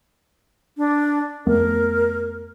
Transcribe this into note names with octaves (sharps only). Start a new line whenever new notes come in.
D4
F2 A3 B3 A#4